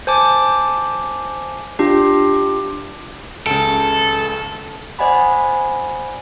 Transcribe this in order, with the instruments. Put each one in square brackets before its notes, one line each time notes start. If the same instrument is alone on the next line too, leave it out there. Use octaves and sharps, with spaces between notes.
[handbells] C5 G#5 A5 D6
D4 F4 G4
[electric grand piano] C#2 C#3 [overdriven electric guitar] A4
[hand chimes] C5 D5 D#5 F#5 G#5 B5